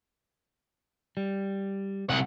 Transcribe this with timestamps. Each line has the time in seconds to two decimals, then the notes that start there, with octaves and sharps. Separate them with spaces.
1.17 G3
2.10 C2 F#5